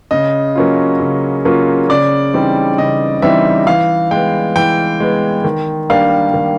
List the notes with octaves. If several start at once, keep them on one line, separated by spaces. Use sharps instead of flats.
C#3 D#5
F#3 A#3 C#4 F4
C#3
F#3 A#3 C#4 F4
C#3 D5
E3 G3 C4 D#4
C#3 D#5
E3 G3 C4 D#4 E5
E3 F5
G#3 B3 G5
E3 G5
G#3 B3
D#3
G3 A#3 D4 F5
D#3